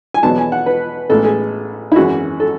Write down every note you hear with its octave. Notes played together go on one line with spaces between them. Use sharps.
G#5
E2 B2 F#3 B3 A5
G#5
F#5
B4
A1 A2 G#3 B3 A4
G#4
E4
G#1 F#2 E3 F#4
A4